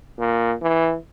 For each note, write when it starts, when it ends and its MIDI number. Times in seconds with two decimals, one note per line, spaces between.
0.19 0.54 46
0.62 0.96 52